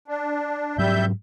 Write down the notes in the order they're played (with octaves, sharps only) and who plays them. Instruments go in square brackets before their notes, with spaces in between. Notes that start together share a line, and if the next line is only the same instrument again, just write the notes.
[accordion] D4
[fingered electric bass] G#2 F#3 [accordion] G3 E5 G6